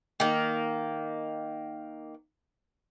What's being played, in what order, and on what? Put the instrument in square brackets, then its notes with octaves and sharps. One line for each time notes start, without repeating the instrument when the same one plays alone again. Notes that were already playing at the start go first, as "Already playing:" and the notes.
[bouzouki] D#3 A#3